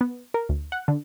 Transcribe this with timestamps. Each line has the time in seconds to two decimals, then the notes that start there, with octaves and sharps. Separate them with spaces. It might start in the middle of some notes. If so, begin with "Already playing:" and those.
0.01 B3
0.34 A#4
0.49 D2
0.72 F#5
0.88 D3